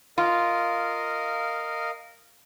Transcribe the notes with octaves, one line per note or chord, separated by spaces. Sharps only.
F4 A#4 D#5 F5